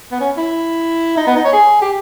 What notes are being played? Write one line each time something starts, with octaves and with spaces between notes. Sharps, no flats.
B3
C#4
E4
D#4
B3
D#4
C#5
G#4
G4